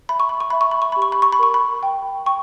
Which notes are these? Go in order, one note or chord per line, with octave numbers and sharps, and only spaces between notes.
E5 B5
C#6
B5
C#6
E5 B5
C#6
B5
C#6
G4 B5
C#6
B5
C#6
B5
A#4 C#6
B5
G5
G5 C#6